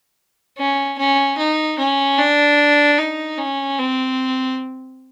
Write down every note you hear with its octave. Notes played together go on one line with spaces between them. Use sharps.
C#4
C#4
D#4
C#4
D4
D#4
C#4
C4